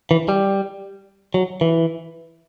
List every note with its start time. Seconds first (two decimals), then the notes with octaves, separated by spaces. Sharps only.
0.11 E3
0.29 G3
1.34 F#3
1.61 E3